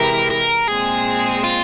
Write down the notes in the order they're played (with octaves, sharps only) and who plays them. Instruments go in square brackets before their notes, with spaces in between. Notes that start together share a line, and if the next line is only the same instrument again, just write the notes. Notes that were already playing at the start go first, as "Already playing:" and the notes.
Already playing: [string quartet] C3 E3 G#3 E4 G4 [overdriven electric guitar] A#4
[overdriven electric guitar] A#4
[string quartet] A#2 G#3 C4 [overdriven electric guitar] G#4
[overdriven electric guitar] F4